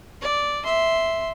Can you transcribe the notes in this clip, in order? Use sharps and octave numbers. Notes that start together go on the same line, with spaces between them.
D5
E5 C6